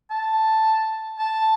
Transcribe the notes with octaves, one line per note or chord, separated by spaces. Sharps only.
A5
A5